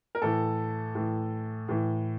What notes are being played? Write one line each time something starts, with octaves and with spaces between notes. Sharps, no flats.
A#4
A2 E3 A4
A2 E3
A2 E3